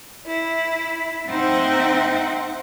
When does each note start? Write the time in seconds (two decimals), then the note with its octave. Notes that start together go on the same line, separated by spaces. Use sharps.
0.25 E4
1.28 C4 D#4 C5 E5 F#5 G5